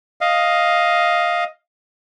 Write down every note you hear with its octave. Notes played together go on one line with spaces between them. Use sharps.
D#5 F5